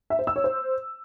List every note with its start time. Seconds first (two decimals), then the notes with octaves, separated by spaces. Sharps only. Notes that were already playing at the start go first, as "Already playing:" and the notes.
0.10 E5
0.19 C5
0.27 E6
0.36 C#5
0.44 C5